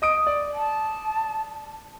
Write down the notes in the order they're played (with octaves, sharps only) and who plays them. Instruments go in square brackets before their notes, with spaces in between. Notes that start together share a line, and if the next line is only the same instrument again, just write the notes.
[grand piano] D#5 D#6 D7
D5
[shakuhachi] A5